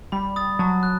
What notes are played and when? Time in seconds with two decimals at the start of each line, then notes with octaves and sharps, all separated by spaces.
0.12 G3 B5
0.36 D#6 A6
0.59 F#3 A5
0.83 F#6